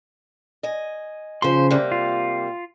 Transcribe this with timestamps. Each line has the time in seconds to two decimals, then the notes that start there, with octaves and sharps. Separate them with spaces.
0.63 D#5 G#5
1.42 C#3 F3 C5 C6
1.71 C3 G3 A#3
1.92 F4